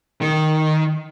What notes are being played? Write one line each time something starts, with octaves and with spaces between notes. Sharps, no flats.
D#3